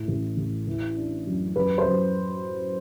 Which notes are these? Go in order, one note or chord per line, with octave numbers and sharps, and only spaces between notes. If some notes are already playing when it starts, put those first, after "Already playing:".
Already playing: A2
A1
A1
E3
D4
F#2
F#2 B4
C5
F#2